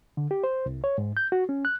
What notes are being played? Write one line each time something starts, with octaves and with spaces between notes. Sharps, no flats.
D3
G4
C5
C2
C#5
G#2
G6
F#4
C#4
F#6